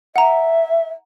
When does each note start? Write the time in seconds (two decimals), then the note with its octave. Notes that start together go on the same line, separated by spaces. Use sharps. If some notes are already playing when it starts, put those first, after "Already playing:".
0.16 E5 F#5 A#5